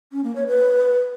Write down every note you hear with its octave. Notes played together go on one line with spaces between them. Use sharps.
C#4
A#3
C#5
B4